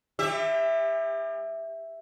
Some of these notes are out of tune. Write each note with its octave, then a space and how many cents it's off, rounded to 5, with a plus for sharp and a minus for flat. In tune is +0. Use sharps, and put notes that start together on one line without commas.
G3 +45 G4 +30 E5 +0